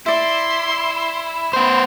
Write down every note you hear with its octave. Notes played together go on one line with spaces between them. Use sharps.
E4 D5 E5 C6
B3 C5